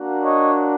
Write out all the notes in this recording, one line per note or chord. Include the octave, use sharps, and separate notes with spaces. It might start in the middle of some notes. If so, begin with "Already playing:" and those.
Already playing: A#3 D4 F#4
C#5 D#5